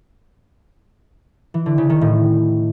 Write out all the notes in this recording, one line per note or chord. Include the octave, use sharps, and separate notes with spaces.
E3
D3
C#3
D#3
A2